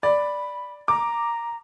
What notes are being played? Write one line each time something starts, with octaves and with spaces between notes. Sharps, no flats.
D5 B5
A#5 D6